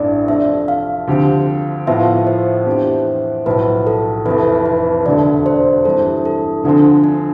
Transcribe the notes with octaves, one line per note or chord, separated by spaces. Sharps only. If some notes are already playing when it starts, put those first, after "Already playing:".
Already playing: A1 G2 E3 A3 C4 D5
F2 C3 F3 A3 D4 E5
F5
D2 D3 F3 C4 G4
A2 F3 B3 F4 E5
C5
F2 E3 B3 D4 G4
B1 A2 F3 B4
A4
F1 F2 E3 B4
B4
E1 D2 D3 A3 D5
C5
G2 E3 G3 C4 E4 A4
A4
D2 D3 F3 C4 D4
D4